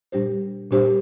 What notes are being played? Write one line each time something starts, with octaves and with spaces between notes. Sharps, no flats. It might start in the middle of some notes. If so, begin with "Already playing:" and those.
A#2 G3 D4 G4 C5
A#2 G3 D4 G4 C5